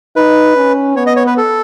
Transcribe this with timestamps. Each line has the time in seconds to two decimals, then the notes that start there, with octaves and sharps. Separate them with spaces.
0.16 D#4 B4
0.56 C#4
0.96 B3 C#5
1.06 D#5
1.16 C#5
1.27 B4
1.37 A4